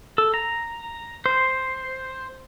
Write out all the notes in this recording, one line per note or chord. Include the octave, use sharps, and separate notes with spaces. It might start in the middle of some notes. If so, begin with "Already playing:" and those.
A4
A#5
C5